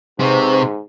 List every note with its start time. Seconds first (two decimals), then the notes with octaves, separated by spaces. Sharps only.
0.20 G#2 C3 B4 C5 C#6